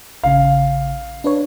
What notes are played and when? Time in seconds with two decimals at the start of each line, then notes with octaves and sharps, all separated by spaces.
0.24 A1 C#3 F5
1.24 D4 B4 C#5